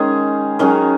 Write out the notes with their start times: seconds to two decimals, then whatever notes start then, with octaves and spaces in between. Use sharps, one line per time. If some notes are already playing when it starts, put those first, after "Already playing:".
Already playing: D#3 G#3 C#4 G#4
0.59 D#3 F#3 C#4 G#4